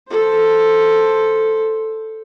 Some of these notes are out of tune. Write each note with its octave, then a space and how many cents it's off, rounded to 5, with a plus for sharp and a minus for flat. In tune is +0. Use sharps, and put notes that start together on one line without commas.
A4 +0 C5 +0